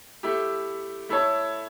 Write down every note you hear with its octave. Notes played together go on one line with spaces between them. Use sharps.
A3 E4 G4
A3 E4 A4 C#5